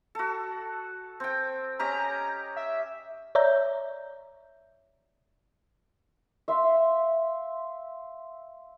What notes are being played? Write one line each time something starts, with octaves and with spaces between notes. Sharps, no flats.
F#4 A4
C4 G5
C#4 G4 D#5 A#5
E5
C#5 D5 E5 A#5 G6
E5 F5 C6